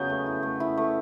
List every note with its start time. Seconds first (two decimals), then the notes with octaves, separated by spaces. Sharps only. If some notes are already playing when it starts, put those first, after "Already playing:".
Already playing: C#3 F#3 B3 G6
0.10 A3
0.26 E4
0.43 A3
0.60 E4
0.77 A3